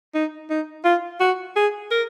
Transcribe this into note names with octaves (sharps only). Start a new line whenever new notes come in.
D#4
D#4
F4
F#4
G#4
A#4